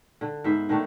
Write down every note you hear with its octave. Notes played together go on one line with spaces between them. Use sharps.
D3
G#2 B3 C5 E5
D3 D#3 A3 D4